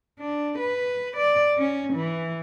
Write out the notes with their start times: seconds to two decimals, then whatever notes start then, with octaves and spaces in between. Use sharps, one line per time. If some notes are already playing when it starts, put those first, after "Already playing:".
0.19 D4
0.59 B4
1.17 D5
1.58 C#4
1.93 E3